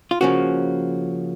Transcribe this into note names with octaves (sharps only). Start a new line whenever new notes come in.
F4
C#3 F3 A#3 C#4 F#4